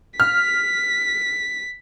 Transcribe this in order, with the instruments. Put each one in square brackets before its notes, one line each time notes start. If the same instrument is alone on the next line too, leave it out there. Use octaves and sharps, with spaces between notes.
[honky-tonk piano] F6 [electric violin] B6